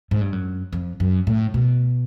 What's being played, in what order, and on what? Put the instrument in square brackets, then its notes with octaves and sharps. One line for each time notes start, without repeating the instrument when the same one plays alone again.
[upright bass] G#2
G2
F#2
F2
F#2
A2
B2